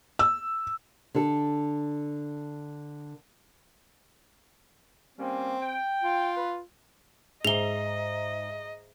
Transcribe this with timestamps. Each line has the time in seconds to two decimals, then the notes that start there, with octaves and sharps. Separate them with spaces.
0.19 E6
1.15 D3 A4
5.18 G3 A#3 C4 C#4
5.61 G5
6.02 F4
6.36 B4
7.45 G#2 G#4 D#5 E5 A#5 F7 G7